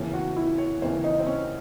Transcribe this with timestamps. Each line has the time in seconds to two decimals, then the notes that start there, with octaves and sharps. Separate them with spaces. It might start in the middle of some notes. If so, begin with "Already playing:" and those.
Already playing: D#2 C#3 E3
0.13 F#4
0.36 E4
0.58 C#5
0.82 D#2 C#3 E3 C5
1.04 D#4
1.20 C4
1.27 C#4